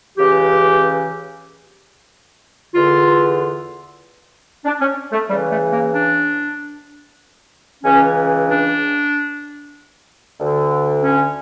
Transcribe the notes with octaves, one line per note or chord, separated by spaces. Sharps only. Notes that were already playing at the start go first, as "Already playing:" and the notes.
C#2 C#3 E3 G4
E2 D3 F4
D4
C#4
A3
E2 C#3 E3 G3
A3
A#3
D4
C#2 C#3 E3 C#4
D4
D2 D3
C#4